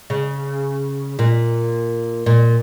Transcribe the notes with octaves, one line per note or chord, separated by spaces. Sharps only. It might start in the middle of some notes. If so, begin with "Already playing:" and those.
C#3
A#2
A#2